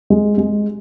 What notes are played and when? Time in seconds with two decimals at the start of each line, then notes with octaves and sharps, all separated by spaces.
0.10 G#3
0.38 G#3